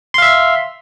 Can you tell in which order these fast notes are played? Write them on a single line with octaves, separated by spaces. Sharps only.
C6 F5 E5